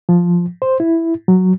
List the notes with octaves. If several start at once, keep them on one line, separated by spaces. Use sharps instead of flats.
F3
C5
E4
F#3